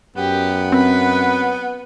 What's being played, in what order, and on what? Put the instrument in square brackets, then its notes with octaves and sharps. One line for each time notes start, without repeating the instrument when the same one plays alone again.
[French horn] F#2 [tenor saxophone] B3 [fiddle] G4
[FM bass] C4 [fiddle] B4